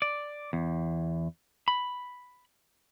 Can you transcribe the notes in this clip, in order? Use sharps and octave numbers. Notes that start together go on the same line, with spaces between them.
D5
E2
B5